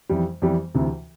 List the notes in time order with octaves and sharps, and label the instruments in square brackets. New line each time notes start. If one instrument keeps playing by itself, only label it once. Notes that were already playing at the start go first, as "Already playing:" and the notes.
[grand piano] F2 E3 G3
F2 E3 G3
D2 C3 E3